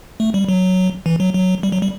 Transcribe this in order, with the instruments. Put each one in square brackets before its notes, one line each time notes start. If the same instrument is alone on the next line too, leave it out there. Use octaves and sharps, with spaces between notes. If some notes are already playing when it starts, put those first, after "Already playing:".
[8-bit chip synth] A3
G3
F#3
E3
F#3
F#3
G3
F#3
G3